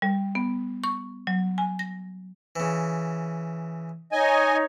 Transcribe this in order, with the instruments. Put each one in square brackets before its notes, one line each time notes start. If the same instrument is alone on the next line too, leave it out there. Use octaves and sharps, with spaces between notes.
[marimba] G3
B3
C#6
F#3
G#5
A#6
[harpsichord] C#3 E3
[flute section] D#4 C#5 [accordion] D#5 G#5